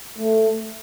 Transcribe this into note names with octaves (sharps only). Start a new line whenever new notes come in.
A3